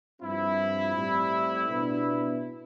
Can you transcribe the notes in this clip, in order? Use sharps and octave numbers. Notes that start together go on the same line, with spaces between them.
G2 F3 C4 E4
A2 G3 C4
B2 B3 D4